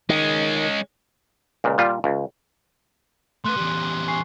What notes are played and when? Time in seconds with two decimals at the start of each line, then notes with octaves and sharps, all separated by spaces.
0.09 D#3 G#3 C#4
1.64 C#2 A#2
1.78 A#2 G3 F4
2.04 C#2
3.44 A3 B4 C6 F#6 D#7
3.56 E2 G3
4.08 G#5 C#6 C7